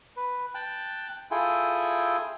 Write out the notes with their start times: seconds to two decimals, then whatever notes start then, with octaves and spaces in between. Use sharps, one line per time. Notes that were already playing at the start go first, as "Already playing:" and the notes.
0.17 B4
0.55 G5 A5 F#6
1.31 E4 F4 G#4 A4 G5 G#5